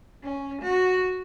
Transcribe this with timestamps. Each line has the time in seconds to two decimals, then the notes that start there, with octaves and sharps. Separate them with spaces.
0.23 C#4
0.62 F#4